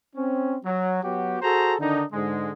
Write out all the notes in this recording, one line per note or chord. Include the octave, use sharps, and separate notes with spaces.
C4 C#4
F#3
F#3 B3 F#4 G4
F#4 G#4 A4 C5 A#5
D3 D#3 D4 D#4
G#2 D3 G#3